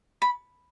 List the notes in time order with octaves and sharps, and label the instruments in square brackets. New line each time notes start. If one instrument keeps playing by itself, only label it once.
[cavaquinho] B5